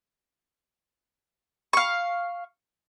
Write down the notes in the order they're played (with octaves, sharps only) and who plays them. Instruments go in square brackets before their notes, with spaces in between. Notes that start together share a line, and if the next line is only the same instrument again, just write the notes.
[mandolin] F5 C#6